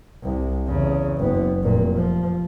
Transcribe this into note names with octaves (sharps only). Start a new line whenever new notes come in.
C2
E2 C#3
F#1 B3
F1 A#2
F3